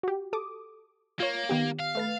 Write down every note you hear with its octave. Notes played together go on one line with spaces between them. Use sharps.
F#4 G4
A4 D6 D#6
A#3 F4 C#5
D#3 B3 G4
F5
A3 B4 A6